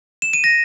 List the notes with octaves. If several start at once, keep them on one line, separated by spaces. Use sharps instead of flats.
E7
D#7
A#6